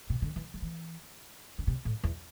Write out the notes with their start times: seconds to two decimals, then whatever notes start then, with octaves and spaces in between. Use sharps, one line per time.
0.10 C3
0.22 D3
0.36 E3
0.54 G3
0.62 E3
1.58 D3
1.67 C3
1.85 A2
2.04 E2